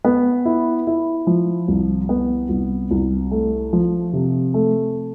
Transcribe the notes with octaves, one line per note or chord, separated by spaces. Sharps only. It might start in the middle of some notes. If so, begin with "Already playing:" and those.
B3
E4
E4
F3
C2
B3
C2
C2
A3
F3
C3
A3